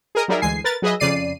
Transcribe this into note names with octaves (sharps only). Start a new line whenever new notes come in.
G#4 A#4 D#5
F#3 G3 D#4 G#4 A#4 E5
D2 E3 G#3 G#5 C7
A#4 B4 A6
F#3 G#4 B4 D#5 E5
F2 C#3 D5 C7 D#7